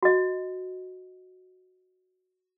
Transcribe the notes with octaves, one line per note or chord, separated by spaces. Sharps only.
F#4 D#5